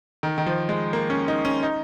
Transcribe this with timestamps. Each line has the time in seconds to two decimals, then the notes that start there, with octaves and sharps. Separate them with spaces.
0.23 D#3
0.38 D#3
0.46 F3
0.69 G#3
0.93 A#3
1.10 C#4
1.28 D#4
1.45 C#4
1.63 D#4